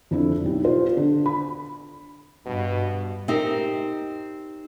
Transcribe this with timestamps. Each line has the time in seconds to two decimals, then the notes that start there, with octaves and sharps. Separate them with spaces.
0.11 F2 D3 D4 E4
0.44 B1 G4
0.64 F4 C5 D5
0.97 D3
1.26 B5
2.46 G2 B2
3.28 C4 D#4 G4 A#4